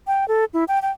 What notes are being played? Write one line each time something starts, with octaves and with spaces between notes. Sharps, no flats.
G5
A4
E4
G5
G5